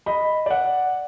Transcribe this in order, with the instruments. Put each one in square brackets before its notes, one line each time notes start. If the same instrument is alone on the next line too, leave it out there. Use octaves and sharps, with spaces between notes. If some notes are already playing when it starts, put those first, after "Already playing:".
[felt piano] D#5 B5
D5 F#5